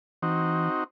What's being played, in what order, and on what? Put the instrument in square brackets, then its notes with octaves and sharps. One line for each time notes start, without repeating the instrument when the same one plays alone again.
[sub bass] E3 [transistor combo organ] C4 D#4 F#4